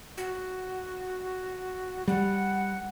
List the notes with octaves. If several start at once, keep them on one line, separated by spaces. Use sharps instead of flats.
F#4
G3 F#5